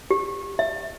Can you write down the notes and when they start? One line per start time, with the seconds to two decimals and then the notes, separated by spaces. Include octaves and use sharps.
0.11 G4
0.59 E5